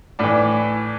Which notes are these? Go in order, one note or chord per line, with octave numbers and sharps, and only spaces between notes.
A2 E3 D4